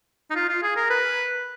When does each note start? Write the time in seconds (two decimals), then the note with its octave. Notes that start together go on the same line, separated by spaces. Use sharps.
0.31 D#4
0.35 F4
0.49 F4
0.63 G#4
0.76 A#4
0.90 B4